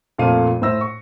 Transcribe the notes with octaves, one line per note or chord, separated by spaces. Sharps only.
F2 A#2 A3 A4 F5 D#7
A2 C5 E5 E6 A#6
C#6